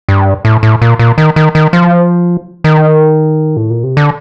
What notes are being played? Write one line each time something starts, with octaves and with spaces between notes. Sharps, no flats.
G2
A2
A2
A#2
A#2
D#3
D#3
D#3
F3
D#3
A2
A#2
C3
D3